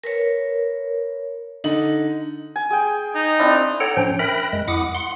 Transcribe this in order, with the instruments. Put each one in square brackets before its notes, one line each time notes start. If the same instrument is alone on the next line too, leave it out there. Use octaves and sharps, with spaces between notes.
[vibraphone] A#4 B4 C#5
[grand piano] D3 D#4 F#7
[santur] G#5
G#4 G5
[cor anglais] D#4
[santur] C4 D4 E4
[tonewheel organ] A4 C#5 F#5 G5 A#5
A2 F3 C#4 D4 C5 G5
A#4 E5 G5 B5 F#6 A#6
F#2 G#3
F2 E4 F#5 D6 D#6
F#5 C6